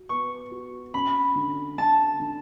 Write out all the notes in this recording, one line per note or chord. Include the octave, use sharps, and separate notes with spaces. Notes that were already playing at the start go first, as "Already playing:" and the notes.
Already playing: F#4
B3 C#6
F#4
C#4 B5
D3
D3 A5
D3